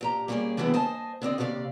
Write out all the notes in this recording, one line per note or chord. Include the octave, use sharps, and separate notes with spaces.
A#2 G4 A#5
G3 A#3 C#4 G4 G#4 D5
D3 E3 G3 B3 E4 G#4
C5 D#5 G#5 A5
D3 C4 D5 D#5
D#2 C3 G4 D5 F5